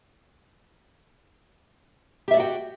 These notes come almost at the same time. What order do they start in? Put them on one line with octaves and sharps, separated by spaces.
G4 E5 D5 F#4 G5